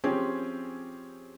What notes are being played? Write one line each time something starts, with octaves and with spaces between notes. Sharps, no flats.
F3 C4 C#4 G4 G#4